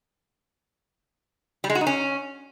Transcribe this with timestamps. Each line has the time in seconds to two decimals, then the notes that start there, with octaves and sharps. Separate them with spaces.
1.64 G3
1.70 G#3
1.75 F#4
1.81 D#4
1.87 C#4